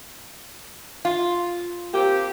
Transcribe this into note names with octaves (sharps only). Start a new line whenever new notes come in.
F4
A#3 C4 G4